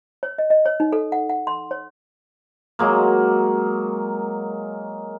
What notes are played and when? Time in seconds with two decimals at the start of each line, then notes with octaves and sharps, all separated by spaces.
0.23 C#5
0.38 D#5
0.50 D#5
0.66 C#5
0.80 D#4
0.93 A4
1.12 F#5
1.29 F#5
1.47 C6
1.71 C#5
2.79 F#3 G#3 A#3